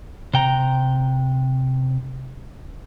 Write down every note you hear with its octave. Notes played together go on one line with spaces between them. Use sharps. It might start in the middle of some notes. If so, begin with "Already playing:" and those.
C3 G5 A#5